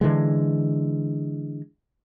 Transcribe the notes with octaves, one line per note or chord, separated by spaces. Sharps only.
D3 E3 G#3